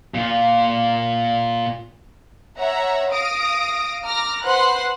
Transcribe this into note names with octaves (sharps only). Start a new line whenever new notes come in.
A#2 F4
C#5 E5 F#5 A#5
F5 D#6 A#6 D7
A#5 D6 F6 A#6
B4 C5 F#5 B5 C6 F#6